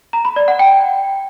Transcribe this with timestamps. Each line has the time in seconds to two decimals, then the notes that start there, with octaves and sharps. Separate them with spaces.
0.13 A#5
0.25 B5
0.36 D5
0.48 F#5
0.59 G5